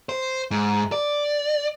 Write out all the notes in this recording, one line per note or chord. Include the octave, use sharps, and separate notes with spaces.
C5
G#2
D5